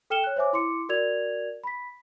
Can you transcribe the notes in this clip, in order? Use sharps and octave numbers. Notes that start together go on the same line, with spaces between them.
A4 G5 F6 C#7 E7 G7
C#5 F#6
C5 C#5 E5 G#5 D6
E4 C6 D6 C#7
F#4 A#4 D5 G#6 F7
B5 B6